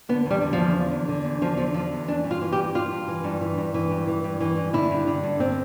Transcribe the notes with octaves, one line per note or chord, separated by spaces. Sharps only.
D3 B3
E2 G3
D3
F3
E2
D3
E2
D3
E2
D3 F3
E2 F3
D3 F3
E2
E3 D4
G2
F4
E3
G4
G2
E3 F4
G2
E3
G2
E3
G2
E3
G2
E3
G2
E3
G2
D3 E4
G2
D3
G2
D3 C4